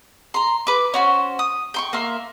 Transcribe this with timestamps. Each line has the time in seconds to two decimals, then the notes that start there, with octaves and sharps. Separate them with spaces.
0.34 A#5 C6
0.67 B4 D6
0.94 C#4 F#4 C5
1.39 D#6
1.74 G5 C6 C#6
1.93 A#3 E5 C6